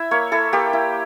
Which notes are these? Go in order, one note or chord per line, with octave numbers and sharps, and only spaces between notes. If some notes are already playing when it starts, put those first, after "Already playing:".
Already playing: E4 E5
A#3 C#5
E4 A4
A#3 G4
E4